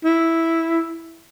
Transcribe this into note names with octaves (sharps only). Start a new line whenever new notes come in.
E4